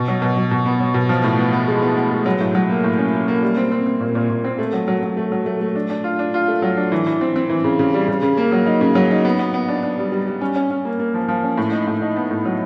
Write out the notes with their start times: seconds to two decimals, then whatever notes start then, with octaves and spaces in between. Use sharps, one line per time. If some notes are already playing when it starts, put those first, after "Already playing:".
Already playing: B2
0.08 F#3
0.22 B2
0.37 F#3
0.51 B2
0.66 B3
0.80 F#3
0.94 B2
1.09 F3
1.24 A2
1.38 B3
1.53 B3
1.68 G#3
1.82 B3
1.97 B3
2.11 G#3
2.26 F#3
2.41 A2
2.55 F#3
2.70 A#3
2.84 A2
2.99 C#4
3.13 A#3
3.28 A#3
3.42 G3
3.57 C4
3.72 C4
3.86 C4
4.00 A#2
4.15 A#2
4.30 A#2
4.44 C4
4.59 A3
4.73 F#3
4.88 F#3
5.03 F#3
5.17 A3
5.32 F#3
5.46 A3
5.61 A3
5.76 D4
5.90 D4
6.04 F4
6.19 D4
6.34 F4
6.48 A3
6.62 F#3
6.77 D4
6.92 E3
7.07 E3
7.21 C4
7.36 C4
7.49 E3
7.64 C#3
7.79 C#3
7.94 G3
8.08 C#3
8.23 C#3
8.37 A#3
8.52 F#3
8.66 D#4
8.81 C#3
8.95 F#3
9.11 D#4
9.25 B3
9.39 B3
9.54 B3
9.68 D4
9.83 D4
9.98 G3
10.12 G3
10.27 G3
10.41 C#4
10.56 C#4
10.71 C#4
10.85 A#3
10.99 A#3
11.14 F3
11.28 F3
11.44 C#4
11.58 A2
11.72 D#4
11.87 A2
12.02 D#4
12.16 B3
12.31 A2
12.45 F#3